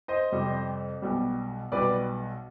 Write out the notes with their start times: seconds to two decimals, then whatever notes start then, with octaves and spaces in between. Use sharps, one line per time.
0.08 C5 D#5
0.32 F2 C3 G3
1.02 B1 B2 G3
1.72 B1 B2 G3 B4 D5